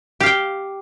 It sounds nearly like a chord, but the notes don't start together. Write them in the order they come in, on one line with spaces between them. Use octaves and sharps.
G4 F5 G5